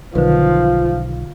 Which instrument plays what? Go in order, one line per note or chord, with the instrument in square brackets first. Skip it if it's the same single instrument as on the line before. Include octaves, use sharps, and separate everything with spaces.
[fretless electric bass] B1 D#3 [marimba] D3 B4 [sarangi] F3